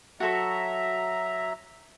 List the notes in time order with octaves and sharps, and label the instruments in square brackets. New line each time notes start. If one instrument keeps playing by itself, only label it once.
[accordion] F#3 E5 A#5 [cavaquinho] F#4 A4 C#6